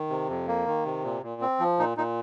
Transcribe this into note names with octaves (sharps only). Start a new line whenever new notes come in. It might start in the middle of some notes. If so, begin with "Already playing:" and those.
Already playing: D#3
C3
F2
A#3
D#3
C3
A#2
A#2
C4
F3
A#2 D#4
A#2 D#4